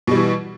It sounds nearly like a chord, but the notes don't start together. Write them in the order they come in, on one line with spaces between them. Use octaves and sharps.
B2 G3 E3